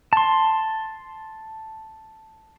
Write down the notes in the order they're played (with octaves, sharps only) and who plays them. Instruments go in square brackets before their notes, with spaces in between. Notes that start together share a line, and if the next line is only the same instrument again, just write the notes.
[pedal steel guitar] A5 C6